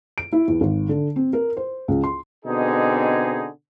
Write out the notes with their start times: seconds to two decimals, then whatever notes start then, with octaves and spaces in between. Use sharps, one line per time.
0.18 D7
0.33 E4
0.48 E2
0.61 G#1
0.89 D3
1.16 C4
1.33 A#4
1.57 C5
1.88 C#2
2.04 C6
2.45 B2 D3 C4 D#4 G#4